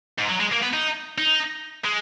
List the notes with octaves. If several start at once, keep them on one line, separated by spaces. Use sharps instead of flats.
G#2
F#3
G#3
A#3
B3
D#4
D#4
G#3